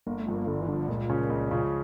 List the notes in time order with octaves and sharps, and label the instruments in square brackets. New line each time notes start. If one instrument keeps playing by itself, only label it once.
[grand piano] G1 [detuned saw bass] A#3
[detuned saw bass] A3
[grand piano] G2 F3
[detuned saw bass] A#3
[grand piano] G1 [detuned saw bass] D3
[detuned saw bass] E3
[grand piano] G2 F3 [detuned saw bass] D3
[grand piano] C#2 [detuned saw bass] A#2
[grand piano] C#3 F3 C#4
C#2
C#3 F3 C#4